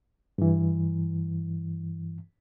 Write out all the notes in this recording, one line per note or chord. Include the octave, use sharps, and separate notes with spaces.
G2 E3